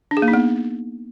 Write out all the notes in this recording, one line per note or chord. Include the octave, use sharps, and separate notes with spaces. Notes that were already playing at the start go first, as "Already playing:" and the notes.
D4
G#4
A#3
D#4
B3